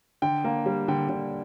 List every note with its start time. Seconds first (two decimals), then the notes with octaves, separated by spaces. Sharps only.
0.22 D3 G5
0.44 A#3
0.66 G3
0.88 D3 G5
1.09 D3